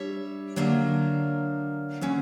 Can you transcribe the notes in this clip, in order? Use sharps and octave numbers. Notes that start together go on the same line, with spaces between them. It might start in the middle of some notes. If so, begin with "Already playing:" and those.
Already playing: G3 D4 C#5 E5
D3 F#3 A#3 D4
D3 F#3 C#4